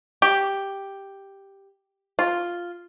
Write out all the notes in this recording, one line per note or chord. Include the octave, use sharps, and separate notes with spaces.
G4
F4